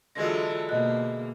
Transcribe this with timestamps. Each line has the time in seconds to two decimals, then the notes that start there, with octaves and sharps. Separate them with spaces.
0.15 D3 E3 F#3 G#3 F4 A4 G#6 A#6
0.69 B2 A#3 D#5 F#6